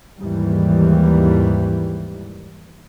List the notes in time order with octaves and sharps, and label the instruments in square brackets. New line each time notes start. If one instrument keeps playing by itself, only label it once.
[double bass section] D#2 G#2 E3 G3